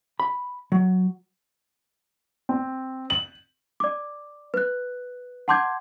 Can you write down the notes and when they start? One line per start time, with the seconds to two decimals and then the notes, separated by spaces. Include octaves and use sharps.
0.20 B5
0.72 F#3
2.49 C4
3.10 F#7
3.80 D5 D6
4.54 B4 F#6
5.48 F#5 A5 C6 D6 G6 G#6